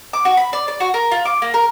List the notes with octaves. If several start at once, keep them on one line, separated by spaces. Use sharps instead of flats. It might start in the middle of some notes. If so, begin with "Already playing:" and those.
D6
F#4
B5
D5
D5
F#4
A#4
F4
D6
A#3
A#4